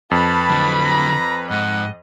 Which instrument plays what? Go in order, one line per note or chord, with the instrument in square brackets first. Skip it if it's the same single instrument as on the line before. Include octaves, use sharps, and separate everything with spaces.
[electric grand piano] F2 [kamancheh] B4 B5 [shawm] A5
[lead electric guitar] D3 F#3
[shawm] A#5
[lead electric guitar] G#2 [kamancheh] D#5 [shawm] F#5